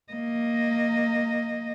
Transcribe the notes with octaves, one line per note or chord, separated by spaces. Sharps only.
A#3 D#5